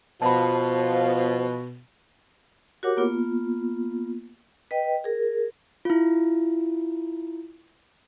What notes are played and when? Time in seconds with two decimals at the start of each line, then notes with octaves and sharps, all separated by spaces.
0.22 B2 F3 F4 C5 A5 B5
2.83 F#4 G4 A#4 C#5 F#5 D6
2.97 A#3 B3 F4
4.71 B4 D#5 G5
5.04 G#4 A#4
5.85 E4 F4